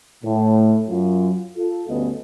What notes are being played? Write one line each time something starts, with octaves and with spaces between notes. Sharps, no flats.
A2
F#2 F#3 F4
F4 A4
D2 G2 B3 C#4 A4 D#5